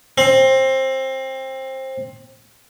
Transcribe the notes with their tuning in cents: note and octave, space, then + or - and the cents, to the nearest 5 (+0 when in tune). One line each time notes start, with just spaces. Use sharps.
C4 +20